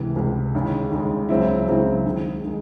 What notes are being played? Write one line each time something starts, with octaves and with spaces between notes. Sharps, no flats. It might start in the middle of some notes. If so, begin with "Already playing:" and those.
Already playing: C#2 C3 E3
C#2 C3 E3
D#2 C#3 G#3
D#2 C#3 G#3
C#2 C#3 F#3 C4 E4
C#2 C#3 F#3 C4 E4
D#2 D#3 G#3
D#3 G#3